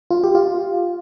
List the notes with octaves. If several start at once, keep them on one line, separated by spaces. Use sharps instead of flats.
F4
G4
F4